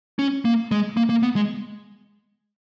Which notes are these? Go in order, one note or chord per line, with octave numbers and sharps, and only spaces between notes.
C#4
A#3
G#3
A#3
A#3
B3
G#3